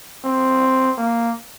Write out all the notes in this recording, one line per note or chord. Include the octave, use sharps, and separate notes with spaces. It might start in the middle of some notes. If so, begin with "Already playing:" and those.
C4
A#3